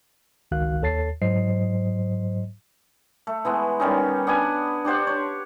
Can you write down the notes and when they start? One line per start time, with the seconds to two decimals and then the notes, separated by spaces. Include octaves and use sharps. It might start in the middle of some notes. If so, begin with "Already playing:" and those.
0.51 G1 C#2 D#3 F#4 F5 F#6
0.82 D#2 A4 C#5 A5 A6 C7
1.22 G#2 F#3 C5 D#5 C7
3.27 A3
3.45 E3 G#3 B3
3.80 D#3 G3 C#4 D#4
4.27 B3 D4 D#5 G#5
4.85 D4 G4 C5 F#5
5.07 C#5